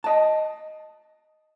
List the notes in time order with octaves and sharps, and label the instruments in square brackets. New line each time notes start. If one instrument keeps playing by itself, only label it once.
[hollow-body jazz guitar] D#5 A5